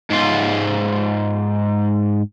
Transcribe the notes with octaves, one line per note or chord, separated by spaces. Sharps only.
G#2 F4